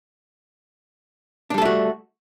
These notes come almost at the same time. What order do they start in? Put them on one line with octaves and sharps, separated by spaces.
D4 G3 A4 A3 F#4